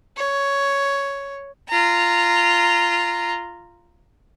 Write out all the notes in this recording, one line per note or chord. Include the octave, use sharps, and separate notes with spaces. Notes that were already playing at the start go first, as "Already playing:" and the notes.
C#5
F4 A#5